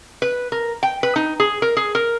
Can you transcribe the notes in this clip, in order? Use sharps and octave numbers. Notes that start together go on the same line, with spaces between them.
B4
A#4
G5
B4
D#4
G#4
A#4
G#4
A#4